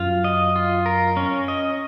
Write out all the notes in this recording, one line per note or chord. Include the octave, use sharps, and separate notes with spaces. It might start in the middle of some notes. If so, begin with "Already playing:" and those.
Already playing: F#2 F4
D#5
F4
A#4
C#4
D#5